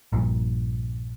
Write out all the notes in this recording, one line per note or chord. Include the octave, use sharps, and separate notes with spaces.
A#1 G2 A#2